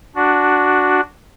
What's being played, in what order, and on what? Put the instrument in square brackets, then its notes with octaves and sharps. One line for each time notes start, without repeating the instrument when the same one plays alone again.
[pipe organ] D4 F#4